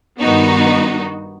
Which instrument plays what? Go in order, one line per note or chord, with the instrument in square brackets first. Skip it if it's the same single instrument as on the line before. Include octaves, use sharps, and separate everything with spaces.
[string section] G2 D#3 B3 D#4 F#4